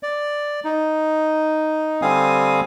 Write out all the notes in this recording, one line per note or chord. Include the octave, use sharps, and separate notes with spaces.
D5
D#4
D3 G3 C4 F5 G#5 D#6